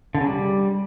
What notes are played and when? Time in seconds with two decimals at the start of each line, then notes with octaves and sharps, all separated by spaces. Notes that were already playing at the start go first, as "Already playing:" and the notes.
0.15 D3
0.21 C#3
0.27 G3